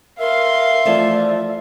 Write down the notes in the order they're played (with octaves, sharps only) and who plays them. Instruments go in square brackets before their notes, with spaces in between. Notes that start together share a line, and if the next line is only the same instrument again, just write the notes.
[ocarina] A#4 [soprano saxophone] E5 [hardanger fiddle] F5 C6
[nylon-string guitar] E3 F3 A3 [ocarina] D5